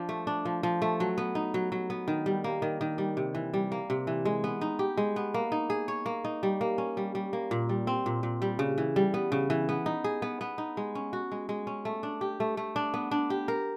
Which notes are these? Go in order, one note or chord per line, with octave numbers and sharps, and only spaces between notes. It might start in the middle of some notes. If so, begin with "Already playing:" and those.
Already playing: F3 D4
A3
D4
F3
F3
A3
F#3
B3
D#4
F#3
F#3
B3
D#3
G3
A#3
D#3
D#3
G3
C3
E3
G3
A#3
C3
E3
G#3
B3
D#4
G4
G#3
B3
A#3
D#4
G#4
C#5
A#3
D#4
G3
A#3
C#4
G3
G3
A#3
A#2
G3
C4
A#2
A#2
G3
C#3
E3
G3
B3
C#3
E3
B3
D#4
G#4
B3
B3
D#4
G#3
C#4
F#4
G#3
G#3
C#4
A3
D4
G4
A3
A3
D4
B3
D4
G4
A#4